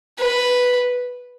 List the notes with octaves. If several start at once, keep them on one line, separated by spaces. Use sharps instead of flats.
B4